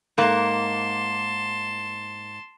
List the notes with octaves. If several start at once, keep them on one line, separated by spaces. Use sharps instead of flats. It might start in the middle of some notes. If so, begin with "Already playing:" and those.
G#2 A#3 A5 C6